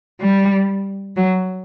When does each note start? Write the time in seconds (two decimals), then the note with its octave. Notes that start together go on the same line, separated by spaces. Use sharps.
0.20 G3
1.16 F#3